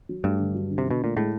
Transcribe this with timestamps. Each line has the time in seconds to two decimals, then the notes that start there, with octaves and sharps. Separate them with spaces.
0.09 F#3
0.24 G2 A3
0.40 D3
0.55 F#3
0.71 D3
0.78 C3
0.86 B2 D3
1.02 A#2 A3
1.16 A2 G#3